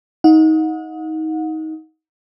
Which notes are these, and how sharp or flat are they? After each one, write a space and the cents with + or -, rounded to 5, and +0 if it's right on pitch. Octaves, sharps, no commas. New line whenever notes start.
D#4 +25 F#5 -35